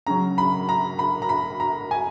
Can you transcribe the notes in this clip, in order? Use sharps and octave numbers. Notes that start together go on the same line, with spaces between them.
C#3 F#3 A#5
B5
A#5
B5
A#5
B5
A#5
G#5